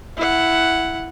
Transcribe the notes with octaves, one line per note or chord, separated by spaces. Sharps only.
E4 F#5